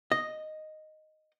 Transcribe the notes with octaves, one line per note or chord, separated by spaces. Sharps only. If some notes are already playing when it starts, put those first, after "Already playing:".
D#5